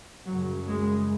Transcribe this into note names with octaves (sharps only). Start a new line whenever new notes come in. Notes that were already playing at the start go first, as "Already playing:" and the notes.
F#2 C#3 F#3
G#3